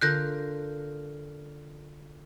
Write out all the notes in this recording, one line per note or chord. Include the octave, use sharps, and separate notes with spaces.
D3 F4 A#4 F#6 G6 A#6